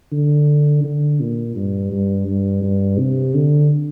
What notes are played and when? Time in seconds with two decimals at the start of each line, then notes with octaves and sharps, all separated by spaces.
0.12 D3
0.84 D3
1.20 A#2
1.56 G2
1.91 G2
2.27 G2
2.63 G2
2.99 C3
3.35 D3